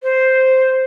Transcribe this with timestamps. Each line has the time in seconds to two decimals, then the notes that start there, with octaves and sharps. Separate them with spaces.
0.03 C5